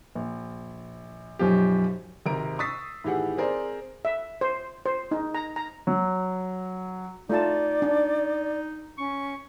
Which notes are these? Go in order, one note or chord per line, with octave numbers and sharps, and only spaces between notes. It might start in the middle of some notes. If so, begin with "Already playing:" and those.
A#1
B1 F#2 F3 G4
G#1 C3 A#4 A#5 D7
C#6 D#6 E6 A6 B6 C7
A2 D#3 E3 G4 G#4 F#5
C4 G#4 A#4 C5 D5
E5
C5
C5
D#4
A#5
A#5
F#3
A3 D#4 F4 D5 A5
D4
C#4 C#6